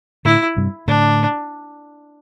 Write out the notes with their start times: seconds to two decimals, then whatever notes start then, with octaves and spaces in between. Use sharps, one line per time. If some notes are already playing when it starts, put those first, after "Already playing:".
0.25 A2 D3 E4
0.57 G2 C3
0.87 A2 D3 D4